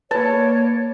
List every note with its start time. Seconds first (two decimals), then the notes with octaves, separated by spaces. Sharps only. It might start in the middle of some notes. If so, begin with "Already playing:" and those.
0.11 A#3 B4 C#5 A5